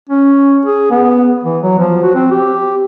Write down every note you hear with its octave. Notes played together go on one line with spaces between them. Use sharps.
C#4
G#4
B3
E3
F#3
F3
F#4
C4
G4